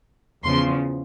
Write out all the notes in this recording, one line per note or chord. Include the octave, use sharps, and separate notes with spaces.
E2 C#3 F3 C6